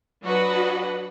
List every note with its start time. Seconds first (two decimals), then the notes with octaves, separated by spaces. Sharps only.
0.23 F#3 D4 F#4 B4 D#5 F#5